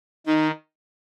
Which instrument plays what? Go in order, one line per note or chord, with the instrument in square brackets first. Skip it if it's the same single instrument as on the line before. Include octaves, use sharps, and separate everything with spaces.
[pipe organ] D#3 [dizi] D#4